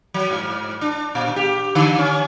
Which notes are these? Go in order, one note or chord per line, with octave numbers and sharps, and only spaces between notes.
F#3
G#2
D4
A#2
G4
D3
C#4